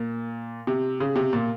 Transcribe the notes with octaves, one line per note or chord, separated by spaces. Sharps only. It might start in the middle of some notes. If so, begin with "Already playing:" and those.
Already playing: A#2
C3
C#3
C3
A#2